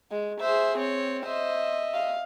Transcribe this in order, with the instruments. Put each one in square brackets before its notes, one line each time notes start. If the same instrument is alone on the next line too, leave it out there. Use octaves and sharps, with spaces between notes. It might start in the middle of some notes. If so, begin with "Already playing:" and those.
[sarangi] G#3
[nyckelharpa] G#4 E5 [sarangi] C5
[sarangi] C4 [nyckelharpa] C#5
[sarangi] C5 [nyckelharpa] D#5 E5
[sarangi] F5